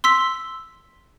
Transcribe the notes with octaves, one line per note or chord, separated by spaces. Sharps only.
C6 E6 B6